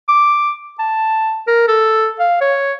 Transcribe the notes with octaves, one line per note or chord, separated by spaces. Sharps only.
D6
A5
A#4
A4
F5
C#5